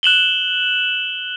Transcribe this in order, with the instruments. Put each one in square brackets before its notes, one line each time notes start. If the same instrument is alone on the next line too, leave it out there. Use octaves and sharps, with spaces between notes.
[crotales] F#6 E7 F#7 G7